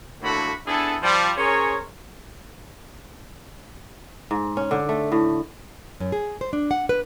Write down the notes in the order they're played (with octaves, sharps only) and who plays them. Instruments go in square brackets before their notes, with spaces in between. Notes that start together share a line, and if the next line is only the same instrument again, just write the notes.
[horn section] A2 D3 A3 A#3 F#4 B5
B3 D4 E4 G#4 A4
F3 G3
C#4 G#4 A#4 C5 C#5
[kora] G#2
C#4
D3
A3
A2
[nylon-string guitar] F#2
G#4
C5
D4
F#5
B4